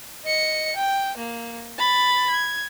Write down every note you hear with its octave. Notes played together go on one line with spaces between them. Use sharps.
D#5 C#7
G5
A#3
B5 A6
G#6